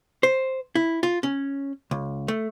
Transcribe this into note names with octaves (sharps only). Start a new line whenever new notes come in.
C5
E4
F4
C#4
C#2
A3